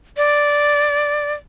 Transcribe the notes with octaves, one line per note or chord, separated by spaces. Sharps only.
D5